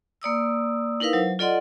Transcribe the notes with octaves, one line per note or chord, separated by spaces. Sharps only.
A#3 D5 D#6 E6
D#4 E4 A#4 B4 F5
F#3 C5
F4 A4 D5 D#5 F#5 C6